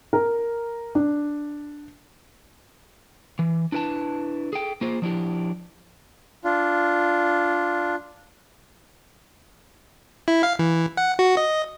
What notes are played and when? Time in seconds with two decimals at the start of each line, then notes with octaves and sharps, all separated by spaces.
0.13 A#4
0.95 D4
3.39 E3
3.72 D4 E4 B4 G#5 A5
4.53 G#4 A4 G5
4.81 A#3 F4 G#4 C5
5.02 F3 D4 E4 G4
6.44 D4 F4
10.28 E4
10.43 F5
10.59 E3
10.97 F#5
11.19 F#4
11.37 D#5